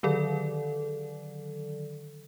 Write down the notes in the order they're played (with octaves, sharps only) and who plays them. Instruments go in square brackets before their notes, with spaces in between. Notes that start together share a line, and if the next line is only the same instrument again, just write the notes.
[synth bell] D3 D#3 F#3 A4 D5